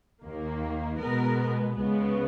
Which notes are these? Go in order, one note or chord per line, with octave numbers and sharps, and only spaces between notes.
D#2 D#3 A#3
B2 G#3 B3 A#4
C#2 C#3 G#3 B3